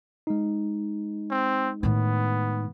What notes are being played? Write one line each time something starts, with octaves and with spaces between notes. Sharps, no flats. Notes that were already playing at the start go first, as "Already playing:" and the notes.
G#3 D#4
C4
A2 D#3 B3